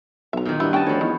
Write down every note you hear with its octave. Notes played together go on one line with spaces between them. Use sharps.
B1 E5 A#5
A#2 D#3
G2 B3 E4
C#4 D#5 G5 A5
D2 F3 C#5
E2 D#3